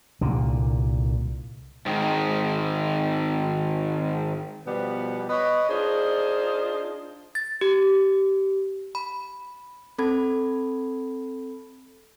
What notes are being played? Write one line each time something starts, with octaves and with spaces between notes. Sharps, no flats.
C2 A#2 D3
G#2 D#3
B2 F3 G3 B3
B4 C#5 D#5
D4 D#4 F4 G#4 C5
A6
G4
B5
C4 A4 B5 G#6